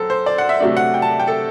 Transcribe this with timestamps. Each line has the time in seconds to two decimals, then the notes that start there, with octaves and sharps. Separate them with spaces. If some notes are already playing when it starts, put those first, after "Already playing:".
Already playing: F#2 C4 A4
0.10 C5
0.26 D5
0.38 F#5
0.49 E5
0.60 C3 F#3 A3 D4
0.77 F#5
0.94 G5
1.02 A5
1.20 G5
1.28 A4